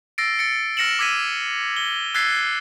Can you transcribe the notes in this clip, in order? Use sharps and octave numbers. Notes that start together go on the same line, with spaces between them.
E6 A6 A#6 C7 D7
A6 C#7
E6 F6 A#6 C#7 E7 F#7
D6 E6 G#6 B6 D#7
G7
E6 F#6 G#6 A6 B6 C7